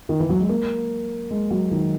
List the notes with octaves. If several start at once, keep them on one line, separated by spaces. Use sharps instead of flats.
D#3
E3
F#3
G#3
A#3
G#3
F#3
D#3